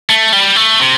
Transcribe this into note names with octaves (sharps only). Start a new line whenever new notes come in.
A3
G3
A3
C3